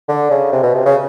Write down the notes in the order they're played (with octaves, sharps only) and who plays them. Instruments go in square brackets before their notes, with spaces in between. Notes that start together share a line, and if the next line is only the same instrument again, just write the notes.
[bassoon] D3
C#3
C3
B2
C3
C#3